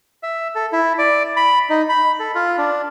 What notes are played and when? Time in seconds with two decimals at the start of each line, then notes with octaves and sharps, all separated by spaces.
0.23 E5
0.55 A4
0.73 E4
0.98 D5
1.37 B5
1.70 D#4
1.89 B5
2.20 A4
2.35 F4
2.58 D4